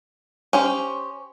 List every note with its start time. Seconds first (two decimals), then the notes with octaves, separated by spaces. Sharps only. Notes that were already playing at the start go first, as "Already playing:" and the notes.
0.53 C#4 G4 C5